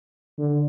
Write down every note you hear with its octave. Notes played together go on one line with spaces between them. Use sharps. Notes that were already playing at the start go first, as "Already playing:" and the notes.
D3